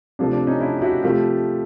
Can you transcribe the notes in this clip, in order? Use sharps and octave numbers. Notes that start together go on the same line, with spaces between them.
C3 F3 A3 D4
D4
C#4 D#4
D4 E4
G4
E4 F#4
C3 F3 A3 F4 G4